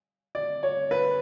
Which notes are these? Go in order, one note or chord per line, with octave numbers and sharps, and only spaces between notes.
D5
C#5
B4